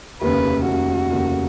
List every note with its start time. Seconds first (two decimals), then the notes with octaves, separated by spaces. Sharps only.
0.21 F1 D#2 C#3 B4
0.67 F1 D#2 C#3 F#4
1.12 F1 D#2 C#3